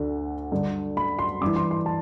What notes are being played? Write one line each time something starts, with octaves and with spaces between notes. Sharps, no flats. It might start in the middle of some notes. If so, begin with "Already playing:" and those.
Already playing: D2 D3
G2 D3
B5
C6
G2 E3 D6
C6
C6
A5